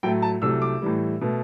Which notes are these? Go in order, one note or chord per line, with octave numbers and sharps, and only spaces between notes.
A2 F#3 A3 G5
A5
C2 C3 F#3 A3 E6
D6
A2 E3 G3
B2 A3